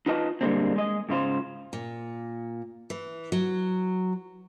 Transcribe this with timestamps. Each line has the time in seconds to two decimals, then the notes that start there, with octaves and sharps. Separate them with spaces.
0.06 D#4 F4 B4 D#5 A5
0.41 A#2 D3 G3 G#3 A#3 C4
0.76 G#3 D#5
1.09 G#2 C#3 F4 C5
1.73 A#2
2.90 E3
3.32 F#3